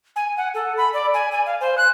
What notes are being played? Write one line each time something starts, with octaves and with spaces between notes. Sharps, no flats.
G#5
F#5
A4
B5
D5
G#5
G#5
F5
C5
F#6